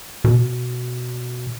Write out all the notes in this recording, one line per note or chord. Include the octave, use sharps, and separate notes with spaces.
B2